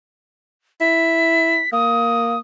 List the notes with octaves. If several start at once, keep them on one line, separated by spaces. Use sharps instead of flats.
E4 B6
A#3 D#6